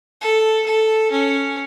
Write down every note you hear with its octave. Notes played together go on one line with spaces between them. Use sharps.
A4
A4
C#4